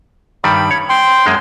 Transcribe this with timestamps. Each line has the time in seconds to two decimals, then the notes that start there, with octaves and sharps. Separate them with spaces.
0.44 G2 D#3 G3 B5
0.71 C#5
0.89 G5 C6
1.26 F#2 G#3 A#3